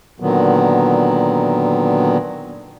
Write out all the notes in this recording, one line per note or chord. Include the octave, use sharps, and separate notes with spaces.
A#2 D3 D#3 F#3 B3